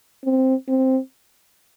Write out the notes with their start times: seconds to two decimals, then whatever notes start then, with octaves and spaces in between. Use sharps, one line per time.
0.25 C4
0.68 C4